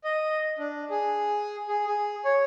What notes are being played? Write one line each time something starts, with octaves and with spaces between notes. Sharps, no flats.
D#5
D4
G#4
G#4
G#4
C#5